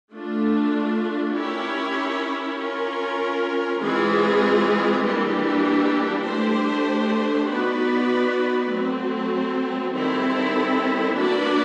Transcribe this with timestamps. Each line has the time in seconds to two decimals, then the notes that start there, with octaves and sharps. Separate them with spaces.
0.12 A3 D4 F4
1.35 C#4 E4 G4 A#4 C#5
2.58 C#4 F4 A#4
3.80 E3 G#3 C4 F4 G#4
5.03 E3 G3 A#3 D4 G4
6.24 A3 D4 G4 C5
7.47 B3 D#4 F#4 B4 D5
8.69 F#3 A3 C4
9.93 D#3 G3 C4 E4 A4
11.15 A#3 D4 F#4 B4 D5